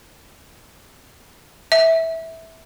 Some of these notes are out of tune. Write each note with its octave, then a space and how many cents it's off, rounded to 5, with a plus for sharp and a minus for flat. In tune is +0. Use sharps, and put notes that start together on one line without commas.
E5 -15